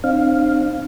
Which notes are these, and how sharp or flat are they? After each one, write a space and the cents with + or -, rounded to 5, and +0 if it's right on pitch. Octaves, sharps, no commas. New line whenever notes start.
C4 +20 D#4 -40 F5 +0